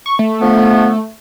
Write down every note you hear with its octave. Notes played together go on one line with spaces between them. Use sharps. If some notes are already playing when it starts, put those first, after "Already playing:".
C#6
A3
D3 F3 B3